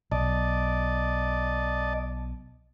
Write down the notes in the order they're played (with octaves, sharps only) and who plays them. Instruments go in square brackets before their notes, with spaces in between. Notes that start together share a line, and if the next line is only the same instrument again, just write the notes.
[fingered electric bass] B1 [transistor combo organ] D5 D#5 A5